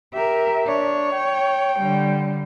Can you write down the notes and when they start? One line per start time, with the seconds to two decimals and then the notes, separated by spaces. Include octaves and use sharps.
0.14 G4 A#4 E5
0.67 D4 C#5
1.12 G5
1.79 D3 G3